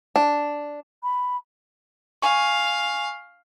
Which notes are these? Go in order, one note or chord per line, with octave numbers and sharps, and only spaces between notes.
D4
B5
F5 G#5 C#6